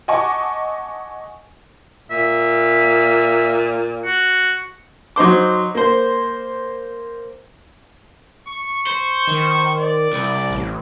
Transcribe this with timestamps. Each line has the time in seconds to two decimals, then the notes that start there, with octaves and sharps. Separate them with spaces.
0.08 D#5 F#5 G#5 A5 C#6 D6
2.11 A#2 E5
4.05 F#4
5.16 F#3 D#4 C5 D6
5.75 A#3 C5
8.49 C#6
8.87 C5
9.27 D#3
9.80 D5
10.13 C2
10.50 A1